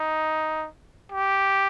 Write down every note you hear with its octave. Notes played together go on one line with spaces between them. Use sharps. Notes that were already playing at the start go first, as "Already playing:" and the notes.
Already playing: D#4
G4